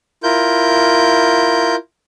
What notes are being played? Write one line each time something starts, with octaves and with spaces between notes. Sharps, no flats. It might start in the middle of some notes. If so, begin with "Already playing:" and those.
E4 F4 A#4 G6